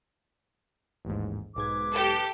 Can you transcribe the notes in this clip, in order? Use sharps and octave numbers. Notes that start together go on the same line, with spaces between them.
A1 D#2 G#2
B1 G#2 B4 D6 G#6
G4 A4